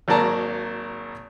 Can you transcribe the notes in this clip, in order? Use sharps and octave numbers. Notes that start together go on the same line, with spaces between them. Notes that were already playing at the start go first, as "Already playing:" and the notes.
G#1 F#3 A#3 D5 A5 A#5